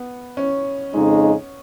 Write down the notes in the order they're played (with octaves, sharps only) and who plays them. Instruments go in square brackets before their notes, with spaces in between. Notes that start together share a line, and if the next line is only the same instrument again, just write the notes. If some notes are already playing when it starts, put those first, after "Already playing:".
Already playing: [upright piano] B3
C#4
[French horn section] F2 C#3 G#3 D#4